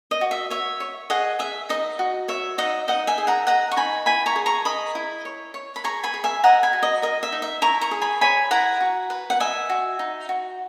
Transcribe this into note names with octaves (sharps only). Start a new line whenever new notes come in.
D#5
F#4
E5
C#5 E5
C#5
G#4 D#5 F#5
G#4 E5
D#4 D#5
F#4
C#5 E5
D#4 D#5 F#5
D#4 D#5 F#5
E5 G#5
G#4
F#5 A#5
D#5 F#5 A#5
C#6
D#4 G#5 B5
E4 G#5 B5
A#5 C#6
G#4
A#5 C#6
D#5 B5 D#6
E4
C#5
C#5
B5
G#4 A#5 C#6
G#5 B5
G#4
E5 G#5
D#5 F#5 A#5
G#5 B5
F#4
D#5
A#4 D#5
E5
D#4
E5
E4 A#5 C#6
A#5 C#6
G#4
G#5 B5
C#5 G#5 B5
E4 F#5 A#5
F#4
B4
F#5
D#5 E5 G#5
F#4
D#4
F#4